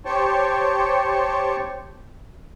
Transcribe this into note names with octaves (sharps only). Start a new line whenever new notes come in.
G4 C5 C#5 G5 A5 C#6